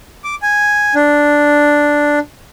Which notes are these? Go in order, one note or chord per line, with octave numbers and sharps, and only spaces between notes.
D6
G#5
D4